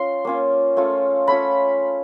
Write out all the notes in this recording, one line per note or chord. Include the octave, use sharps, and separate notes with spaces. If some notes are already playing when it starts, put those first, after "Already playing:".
Already playing: C#4 F4 C6
A#3 C#4 F4
A3 C#4 F4
A3 C#4 F4 B5